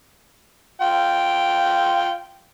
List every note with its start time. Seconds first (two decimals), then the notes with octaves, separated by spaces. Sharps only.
0.81 F4 G5